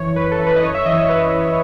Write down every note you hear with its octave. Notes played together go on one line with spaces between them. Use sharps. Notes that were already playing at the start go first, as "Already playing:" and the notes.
Already playing: F#2 E3 C#5
F#2 B4
A4
E3
B4
D#5
F#2 C#5
E5
E3 D#5
C#5
F#2 B4
C#5
E3
C#5